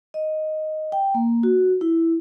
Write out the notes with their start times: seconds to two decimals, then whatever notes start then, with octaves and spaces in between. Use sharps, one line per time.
0.14 D#5
0.92 G5
1.14 A#3
1.43 F#4
1.81 E4